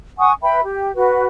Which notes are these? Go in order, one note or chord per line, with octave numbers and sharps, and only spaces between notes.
F#5 G#5 C#6 D#6
B4 E5 G5 B5
G4
F#4 B4